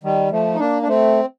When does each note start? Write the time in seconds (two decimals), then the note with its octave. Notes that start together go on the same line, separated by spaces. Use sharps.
0.04 D#3 G3
0.31 F3 A3
0.55 D#4
0.59 A#3 D4
0.82 D4
0.87 A3 C4